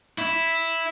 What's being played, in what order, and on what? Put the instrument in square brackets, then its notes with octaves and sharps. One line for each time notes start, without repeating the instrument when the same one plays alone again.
[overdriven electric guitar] E4